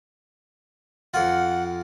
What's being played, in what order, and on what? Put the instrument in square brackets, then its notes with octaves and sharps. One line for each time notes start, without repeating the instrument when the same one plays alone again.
[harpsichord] F2 F4 [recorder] F#5